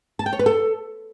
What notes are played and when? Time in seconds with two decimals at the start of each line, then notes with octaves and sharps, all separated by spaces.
0.19 A5
0.26 G5
0.33 C#5
0.39 B4
0.46 A4